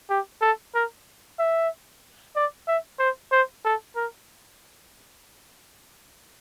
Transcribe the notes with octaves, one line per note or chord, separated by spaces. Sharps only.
G4
A4
A#4
E5
D5
E5
C5
C5
A4
A#4